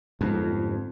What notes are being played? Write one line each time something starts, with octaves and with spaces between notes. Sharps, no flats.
G1 F2 G#2